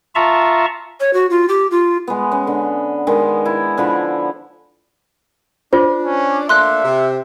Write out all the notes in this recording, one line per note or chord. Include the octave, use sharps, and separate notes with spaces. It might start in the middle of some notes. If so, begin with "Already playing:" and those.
F4 E5 A5 A#5 C#6
C#5
F#4
F4
G4
F4
G#3 B3
B3 C#4
D3
D#3 G#3 B3
E4
D3 F3 E4 B5
D4 F4 C5
C#4
A3 A#3 D4 E5 C6 F#6
C3